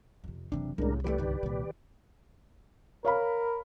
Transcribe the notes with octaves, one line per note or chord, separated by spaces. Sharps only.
F2 C3
F#1 C3 E3 F#3 D4
C2 A2 C#3 G#3 D4 A#4
E3 F3 A3 G4 B4 D5
C#2 G2 D#3
C2 A#2 D#3
A#4 C#5 F5 B5